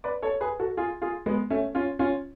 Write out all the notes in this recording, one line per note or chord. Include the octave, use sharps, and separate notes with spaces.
B4 D5
A4 C#5
G#4 B4
F#4 A4
F4 G#4
F4 G#4
G#3 B3
A3 C#4
C#4 F4
C#4 F4